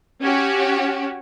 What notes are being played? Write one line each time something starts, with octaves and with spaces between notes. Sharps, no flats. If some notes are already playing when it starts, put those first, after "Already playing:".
C#4 F#4 G4